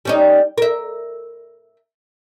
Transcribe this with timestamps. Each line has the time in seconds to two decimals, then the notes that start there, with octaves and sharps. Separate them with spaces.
0.05 G3 C#4 D#4
0.58 A#4 E5